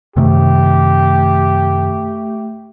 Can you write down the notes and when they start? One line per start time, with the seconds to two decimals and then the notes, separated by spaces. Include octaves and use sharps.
0.16 F#2 C3 D#3 A3 G4